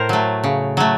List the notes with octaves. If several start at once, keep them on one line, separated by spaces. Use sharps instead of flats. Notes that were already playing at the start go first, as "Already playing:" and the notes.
Already playing: A2 A#4 C5
F#3 A3
C#3
F#3 A3